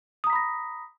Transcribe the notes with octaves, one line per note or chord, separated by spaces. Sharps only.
A#5 B5 D#6 A#6 B6